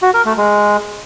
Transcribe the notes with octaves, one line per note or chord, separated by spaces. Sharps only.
F#4
A#4
A3
G#3